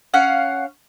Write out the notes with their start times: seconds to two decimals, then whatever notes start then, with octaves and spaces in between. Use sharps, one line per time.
0.14 C#4 F5 F#5